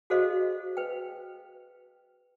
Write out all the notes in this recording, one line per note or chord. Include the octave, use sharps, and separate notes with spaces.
F#4 G#4 A4 C5 D#5 F5
B4 G5